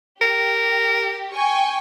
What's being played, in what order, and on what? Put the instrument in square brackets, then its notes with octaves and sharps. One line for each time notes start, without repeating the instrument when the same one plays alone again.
[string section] G4 [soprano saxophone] A#4
[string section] G5 G#5 C#6